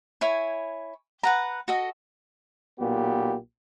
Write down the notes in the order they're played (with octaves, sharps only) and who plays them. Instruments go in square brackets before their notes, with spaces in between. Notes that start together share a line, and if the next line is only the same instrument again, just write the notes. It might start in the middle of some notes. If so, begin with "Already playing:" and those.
[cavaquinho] E4 C#5 G#5
B4 F#5 A#5
F#4 A4 D#5
[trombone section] B1 A#2 B3 G4